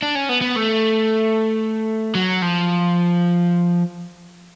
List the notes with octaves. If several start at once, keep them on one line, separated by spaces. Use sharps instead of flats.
D4
C#4
B3
B3
A3
F#3
F3